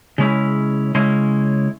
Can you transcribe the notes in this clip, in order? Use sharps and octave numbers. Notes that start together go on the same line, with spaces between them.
C#3 G#3 C#4 E4
C#3 G#3 C#4 E4